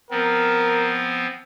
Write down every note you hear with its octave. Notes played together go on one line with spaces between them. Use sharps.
F3 B3 C4 A#4